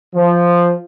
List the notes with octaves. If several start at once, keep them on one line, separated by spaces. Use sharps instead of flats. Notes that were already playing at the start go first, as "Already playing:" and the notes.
F3